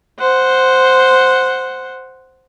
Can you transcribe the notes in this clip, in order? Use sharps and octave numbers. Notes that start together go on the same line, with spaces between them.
C5 F#5